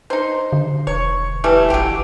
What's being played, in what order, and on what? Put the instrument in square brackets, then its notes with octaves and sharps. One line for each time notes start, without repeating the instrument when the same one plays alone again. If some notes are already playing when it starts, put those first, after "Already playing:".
[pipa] D#4 C5
[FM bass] D3
[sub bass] E1 [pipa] C#5
[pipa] E3 G3 A3
[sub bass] A1 [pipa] F#3 G4